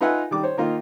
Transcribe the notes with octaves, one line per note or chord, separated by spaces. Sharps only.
D#4 F4 B4 E5 F#5 G#5
D#3 G3 D6
C5 C#5
D#3 A#3 D#4 F4